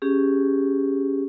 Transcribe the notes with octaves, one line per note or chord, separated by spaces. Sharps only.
C#4 G4 G#4